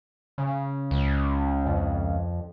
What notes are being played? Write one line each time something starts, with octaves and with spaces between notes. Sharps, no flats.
C#3
C#2
F2